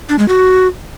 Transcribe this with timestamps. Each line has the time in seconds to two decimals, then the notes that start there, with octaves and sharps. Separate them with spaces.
0.09 D4
0.19 G#3
0.28 F#4